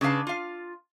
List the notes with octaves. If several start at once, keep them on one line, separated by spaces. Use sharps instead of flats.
C#3 D4 B4 F5 A5
F4 F5